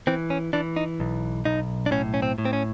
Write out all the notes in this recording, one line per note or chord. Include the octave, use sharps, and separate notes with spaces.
E3 C4
C#4
E3 D4
D#4
B1
B1 D#4
D4
A2 C#4
C#4
C4
A2
C4
C#4